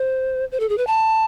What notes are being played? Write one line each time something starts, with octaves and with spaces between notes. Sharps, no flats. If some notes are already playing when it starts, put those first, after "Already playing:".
Already playing: C5
C5
A4
G#4
B4
A5